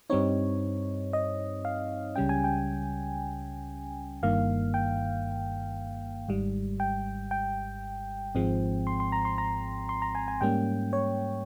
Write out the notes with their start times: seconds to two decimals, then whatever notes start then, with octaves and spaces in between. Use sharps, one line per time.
0.10 G2 G3 C4 D#4 C#5
1.13 D#5
1.65 F5
2.16 C#2 C#3 G3 C#4 G5
2.29 G#5
2.44 G5
4.23 G1 G2 D#3 A#3 F5
4.74 G5
6.29 G#1 G#2 G3
6.80 G5
7.31 G5
8.35 G#1 G#2 F3 G#3 C4
8.87 C6
9.00 C6
9.12 A#5
9.25 C6
9.38 A#5
9.89 C6
10.02 A#5
10.15 G#5
10.28 G#5
10.41 G#2 G3 A#3 C#4 G5
10.93 C#5